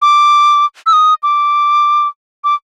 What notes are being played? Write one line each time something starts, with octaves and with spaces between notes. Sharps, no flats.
D6
E6
D#6
D6
D6